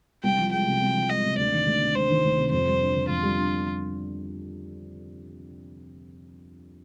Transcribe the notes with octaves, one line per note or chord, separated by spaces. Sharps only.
C2 G5
F3
G#3 G5
C3
C2
F3
G#3 D#5
C3
D2 D5
D#3
D2
C3
D2 C5
D#3
D2
C3
F2 C5
G3
D4
D3
F2 F4
G3
D4